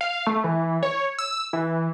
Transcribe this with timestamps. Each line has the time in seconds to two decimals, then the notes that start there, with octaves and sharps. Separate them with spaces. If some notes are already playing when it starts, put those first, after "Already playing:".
0.01 F5
0.27 A3
0.44 E3
0.83 C#5
1.19 E6
1.53 E3